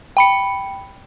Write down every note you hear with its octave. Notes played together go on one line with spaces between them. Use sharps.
G5 B5 C#7